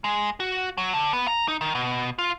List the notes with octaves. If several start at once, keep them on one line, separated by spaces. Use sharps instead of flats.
G#3
F#4
F#3
D3
B3
A#5
D#4
D#3
B2
F4